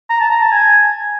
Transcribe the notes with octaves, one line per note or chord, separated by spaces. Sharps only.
A#5
A5
A#5
A5
G#5